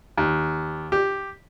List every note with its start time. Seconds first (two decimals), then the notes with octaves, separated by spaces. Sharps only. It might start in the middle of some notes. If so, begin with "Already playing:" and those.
0.17 D#2
0.92 G4